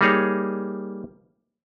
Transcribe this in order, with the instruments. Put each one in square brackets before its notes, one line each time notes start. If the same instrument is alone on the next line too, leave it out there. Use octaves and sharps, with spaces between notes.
[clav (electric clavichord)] G3 A#3 D#4 G#4 C#5